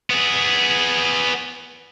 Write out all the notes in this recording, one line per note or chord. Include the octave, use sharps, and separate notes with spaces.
B3 G#4